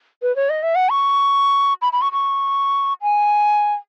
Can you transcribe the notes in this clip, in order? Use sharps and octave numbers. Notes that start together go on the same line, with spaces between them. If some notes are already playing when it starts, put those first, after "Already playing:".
B4
C#5
D#5
E5
F#5
C#6
B5
B5
C#6
C#6
G#5